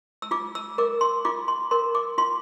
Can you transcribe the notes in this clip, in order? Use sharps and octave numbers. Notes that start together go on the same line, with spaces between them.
E6
F4 D6
E6
A#4 D6
C6
F4 D6
C6
A#4 C6
D6
F4 C6